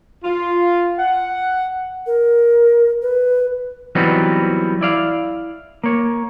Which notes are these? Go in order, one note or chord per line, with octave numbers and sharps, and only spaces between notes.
F4
F#5
A#4
B4
E3 F#3 G3 B3 C4 D#4
E4 D5 F5
A#3 C#5